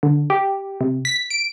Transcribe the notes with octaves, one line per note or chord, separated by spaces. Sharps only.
D3
G4
C3
B6
D7